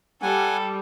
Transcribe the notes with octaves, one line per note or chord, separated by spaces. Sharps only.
G3 A4 F#5 G#5